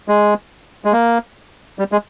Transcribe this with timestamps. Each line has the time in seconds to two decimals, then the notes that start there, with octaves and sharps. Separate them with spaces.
0.08 G#3
0.85 G#3
0.93 A#3
1.79 G3
1.92 G#3